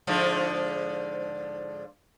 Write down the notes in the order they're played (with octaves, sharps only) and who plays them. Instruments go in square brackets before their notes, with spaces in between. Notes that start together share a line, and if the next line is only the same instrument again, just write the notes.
[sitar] G#2 D3 F3